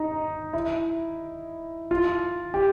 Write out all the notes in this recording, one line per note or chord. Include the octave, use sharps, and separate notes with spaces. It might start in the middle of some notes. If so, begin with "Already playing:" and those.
Already playing: D#4
E4
F4
G4